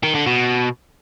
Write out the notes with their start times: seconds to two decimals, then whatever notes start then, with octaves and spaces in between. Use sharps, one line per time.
0.03 D#3
0.15 D3
0.26 B2